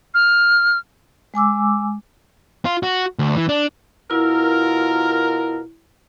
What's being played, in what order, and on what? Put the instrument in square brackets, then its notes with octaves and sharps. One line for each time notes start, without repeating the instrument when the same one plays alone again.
[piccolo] F6
[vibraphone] G#3 G#5 D6 E6
[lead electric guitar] F4
F#4
D2
E3
D4
[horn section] B2 F4 A#4 [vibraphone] E4